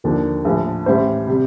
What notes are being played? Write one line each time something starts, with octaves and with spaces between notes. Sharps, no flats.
D#2 D3 F3 A#3 D4 A4
A#1 A2 F3 A3
A1 A2 G3 C5
C3 G3